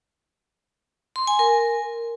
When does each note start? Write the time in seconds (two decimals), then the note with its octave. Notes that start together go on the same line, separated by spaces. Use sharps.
1.16 C6
1.27 G#5
1.39 A#4